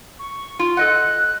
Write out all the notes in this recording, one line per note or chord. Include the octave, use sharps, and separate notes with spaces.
C#6
F4
A4 D#5 F#5 F#6